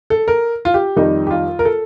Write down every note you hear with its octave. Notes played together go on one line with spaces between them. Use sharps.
A4
A#4
F4
G4
F2 D#3 G3 D#4
G4
F4
A#4
A4